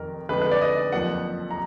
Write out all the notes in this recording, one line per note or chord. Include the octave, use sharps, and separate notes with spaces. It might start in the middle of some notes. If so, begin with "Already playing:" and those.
Already playing: F1 F2 D#3 A#4
F2 D3 G#3 B4
B4
D5
D#5
F#1 F2 F3 A#3 F#5
A#5